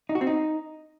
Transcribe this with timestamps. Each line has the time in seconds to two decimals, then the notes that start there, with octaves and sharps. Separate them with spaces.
0.09 D#4
0.15 F#4
0.21 C4
0.27 D#4